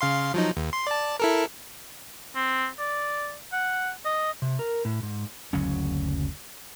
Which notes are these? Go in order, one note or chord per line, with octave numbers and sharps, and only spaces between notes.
C#3 F5 C6
F3 F#3 D#4
D#2
C6
D5 A5
E4 A4 A#4
C4
D5
F#5
D#5
C3
A#4
A2
G#2
F#1 D2 F#3 C#4